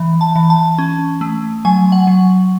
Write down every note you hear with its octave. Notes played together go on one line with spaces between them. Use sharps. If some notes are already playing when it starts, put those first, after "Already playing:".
Already playing: E3
A5
E3
A5
C#4
A3
F#3 G#5
F#5
F#3